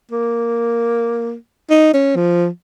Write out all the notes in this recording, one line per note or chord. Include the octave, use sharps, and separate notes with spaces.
A#3
D#4
C#4
F3